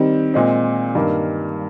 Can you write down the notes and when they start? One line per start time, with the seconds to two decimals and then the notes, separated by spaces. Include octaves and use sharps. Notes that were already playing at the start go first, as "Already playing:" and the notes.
Already playing: D#3 G3 C4 G4
0.34 A#2 G#3 C4
0.95 G2 D#3 A#3